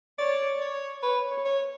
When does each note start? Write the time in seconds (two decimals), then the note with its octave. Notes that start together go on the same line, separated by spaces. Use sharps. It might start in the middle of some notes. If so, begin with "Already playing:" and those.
0.19 C#5 D5
0.61 C#5
1.02 B4 C#5
1.31 C#5
1.45 C#5